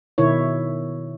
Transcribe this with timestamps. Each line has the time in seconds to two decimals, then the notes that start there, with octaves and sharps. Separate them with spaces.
0.18 B2 D#3 E4 C#5